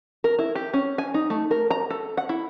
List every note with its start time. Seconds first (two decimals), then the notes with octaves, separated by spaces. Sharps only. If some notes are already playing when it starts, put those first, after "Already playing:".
0.24 A#4
0.39 E4
0.55 G4
0.74 C#4
0.98 G#5
1.14 D#4
1.30 A3
1.51 A#4
1.70 A#5
1.91 A4
2.17 F#5
2.29 E4